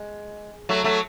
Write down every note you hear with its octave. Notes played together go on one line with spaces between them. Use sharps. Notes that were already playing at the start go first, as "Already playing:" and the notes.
Already playing: G#3
F#3 A3
F#3 A3